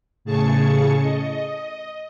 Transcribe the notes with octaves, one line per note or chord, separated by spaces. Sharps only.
A2 C#3 G#4 A5 C#6 C#7
D#5